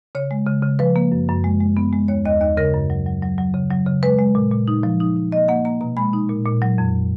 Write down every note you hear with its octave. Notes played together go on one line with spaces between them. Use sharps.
C#3 C#5
G#3
C#3
C#3
F3 B4
A#3
F#2
F#2
G#3
G#3
B3
G#3
D#2 C#5
D#2 D#5
D#2 D#5
C#3 A#4
F#2
F#3
F#3
F#3
F#3
C#3
F#3
C#3
G#3 B4
G#3
A#2
A#2
D#4
F3
D#4
D#4
A#3 D#5
A#3 F#5
A#3 A#5
B2 A#5
G#3 B5
D#4
A#2
A#2
F#3
F2